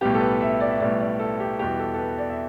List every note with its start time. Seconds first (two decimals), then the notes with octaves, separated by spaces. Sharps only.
0.01 B1 A2 G3 B3 G4
0.15 A4
0.21 B4
0.41 E5
0.60 D5
0.71 E5
0.80 B1 A2 G3 B3 D5
1.00 D5
1.19 A4
1.40 G4
1.59 E2 B2 G3 B3 G4
1.79 A4
1.94 A4
1.99 B4
2.18 D5
2.30 E5